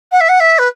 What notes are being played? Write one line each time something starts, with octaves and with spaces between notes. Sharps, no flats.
F#5
E5
F#5
E5
B4